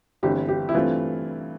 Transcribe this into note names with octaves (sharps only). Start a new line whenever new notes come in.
G1 G2 E3 A3 C4 G4
G4
E4
G2 E3 A3 C4 F4